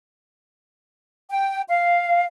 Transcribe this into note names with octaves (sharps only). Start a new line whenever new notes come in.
G5
F5